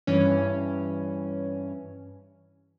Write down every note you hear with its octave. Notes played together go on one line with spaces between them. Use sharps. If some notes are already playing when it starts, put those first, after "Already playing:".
G2 E3 C#4